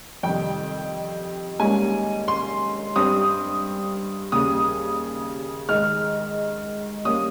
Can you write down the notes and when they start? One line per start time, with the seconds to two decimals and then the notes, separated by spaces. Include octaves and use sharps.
0.23 F2 C3 D#3 G3 G5
1.60 G#2 G3 A#3 C#4 G#5
2.28 C6
2.96 G2 G3 C4 D#6
4.32 D#2 C#3 G3 D#6
5.69 G#2 D#3 G#3 F6
7.05 G3 A#3 C#4 D#6